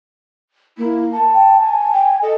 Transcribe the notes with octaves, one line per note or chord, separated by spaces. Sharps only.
A#3 E4
A5
G5
G#5
G5
A4 D#5